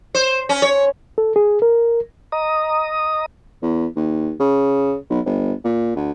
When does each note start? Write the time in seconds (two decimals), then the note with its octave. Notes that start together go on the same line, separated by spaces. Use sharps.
0.15 C5
0.49 C#4
0.62 C#5
1.18 A4
1.36 G#4
1.62 A#4
2.32 D#5 A#5 D#6
3.62 E2
3.96 D#2
4.40 C#3
5.10 B1
5.26 G1
5.64 A#2
5.96 D2